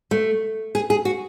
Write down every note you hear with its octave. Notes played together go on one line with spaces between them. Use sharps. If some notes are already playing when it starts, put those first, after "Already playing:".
A3
G#4
G#4
F#4